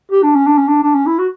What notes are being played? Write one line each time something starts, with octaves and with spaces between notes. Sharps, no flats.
G4
D4
C#4
D4
C#4
D4
D4
C#4
E4
F#4